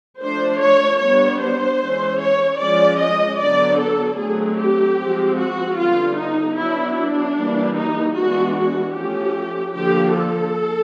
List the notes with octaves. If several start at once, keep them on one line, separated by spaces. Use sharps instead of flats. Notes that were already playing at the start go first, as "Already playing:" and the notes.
F3 A3 D4 C5
C#5
G3 B3 D4 C#5
C5
E3 G#3 C#4
C#5
F3 G#3 C#4 D5
D#5
D3 F#3 B3 D4 D5
A4
D3 F#3 A3 C4 G#4
G4
F3 G#3 C4
F#4
D3 G3 B3 F4
D#4
F#3 B3 D4 E4
D4
E3 G3 A#3
D#4
E3 G#3 B3 D4 F#4
F#4
F3 A3 C#4 G4
D3 F3 A#3 G4
A4